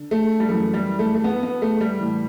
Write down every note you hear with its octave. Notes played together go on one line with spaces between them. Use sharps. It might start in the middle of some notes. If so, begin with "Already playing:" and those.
Already playing: D3
A3
G3
F#2 E3 A3
G3
A3
A3
B3
B3
A3
G3
A2 E3